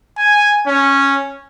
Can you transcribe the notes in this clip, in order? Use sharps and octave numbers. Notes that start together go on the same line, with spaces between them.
G#5
C#4